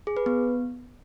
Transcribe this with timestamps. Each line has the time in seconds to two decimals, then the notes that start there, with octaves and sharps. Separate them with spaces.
0.07 G#4
0.17 B4
0.26 B3